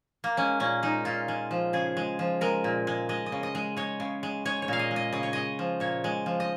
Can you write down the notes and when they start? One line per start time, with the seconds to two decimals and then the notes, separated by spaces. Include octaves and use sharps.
0.24 A#3
0.37 G#3 C#4
0.60 A#2 C#4
0.83 G#3 D#4
1.05 A#2 F4
1.28 G#3
1.51 F3
1.73 C#3 G#4
1.97 G#3
2.19 F3
2.41 G#3 A#4
2.64 A#2
2.87 G#3
3.09 G#3 D#5
3.26 D#5
3.32 C#3
3.43 D#5
3.55 G#3
3.77 G#3 C#5
4.00 C#3
4.23 G#3
4.45 G#3 C#5
4.62 C#5
4.68 A#2 F5
4.79 D#5
4.91 G#3
4.96 D#5
5.13 C#3 D#5
5.23 C#5
5.33 G#3 D#5
5.59 F3
5.80 A#2 C#5
6.04 G#3
6.26 F3
6.40 D#5